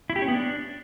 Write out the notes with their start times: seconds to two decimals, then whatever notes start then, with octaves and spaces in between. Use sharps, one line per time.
0.10 E4
0.16 G4
0.22 C#4
0.28 B3
0.34 D4